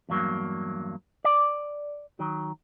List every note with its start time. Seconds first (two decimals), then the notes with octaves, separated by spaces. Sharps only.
0.09 E2 G2 F#3 A#3
1.24 D5
2.19 D#3 F#3